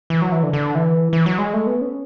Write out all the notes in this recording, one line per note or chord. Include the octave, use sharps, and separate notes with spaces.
E3
F#3
E3
D3
D3
E3
E3
F#3
G#3
A3
B3
C#4